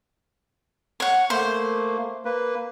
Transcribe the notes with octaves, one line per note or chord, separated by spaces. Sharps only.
C#5 F#5
A3 A#3 C5
A#3 B4